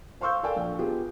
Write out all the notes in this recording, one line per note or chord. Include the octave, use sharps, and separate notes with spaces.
C5 F5 C6 C#6 E6 G6
A4 A#4 D5 F5 G5 G#5
A#1
B3 F4 G4 G#4